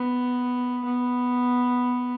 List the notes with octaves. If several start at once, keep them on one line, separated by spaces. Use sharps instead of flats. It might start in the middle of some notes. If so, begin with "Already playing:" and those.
Already playing: B3
B3